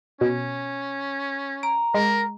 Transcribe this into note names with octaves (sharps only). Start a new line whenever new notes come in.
B2 C#4
A#5 D7
G#3 A#4